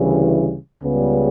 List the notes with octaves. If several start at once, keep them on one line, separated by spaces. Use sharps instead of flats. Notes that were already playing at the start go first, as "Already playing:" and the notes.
Already playing: D2 C#3 E3 G3
C#2 C#3 G3 B3